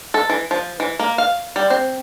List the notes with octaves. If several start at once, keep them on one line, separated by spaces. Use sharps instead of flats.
A4
E3
F3
E3
A#3
F5
G3
C4